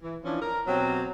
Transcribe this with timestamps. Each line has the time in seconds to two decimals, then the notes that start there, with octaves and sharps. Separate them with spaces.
0.02 E3
0.24 E3 F3 C#4 D4
0.41 A#4
0.67 B2 F#3 C4 G4